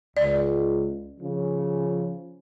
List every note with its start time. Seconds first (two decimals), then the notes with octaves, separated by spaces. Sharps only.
0.17 C#2 D5
1.20 C#3 F3 C#4